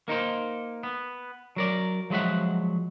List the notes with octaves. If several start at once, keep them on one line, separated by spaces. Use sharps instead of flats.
A#3 D#4 A#4 C5
B3
F#3 A#4 D5
F3 F#3 G#3 E5 F#5